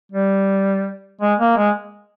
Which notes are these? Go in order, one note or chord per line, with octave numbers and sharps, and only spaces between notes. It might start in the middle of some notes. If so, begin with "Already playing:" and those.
G3
G#3
A#3
G#3